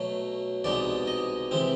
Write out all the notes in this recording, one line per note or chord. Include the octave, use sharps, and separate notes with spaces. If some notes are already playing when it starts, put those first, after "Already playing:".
Already playing: B2 F#3 A3
C2 B2 G#3 B3 D#4 D5
D#5
C3 E3 G#3 C4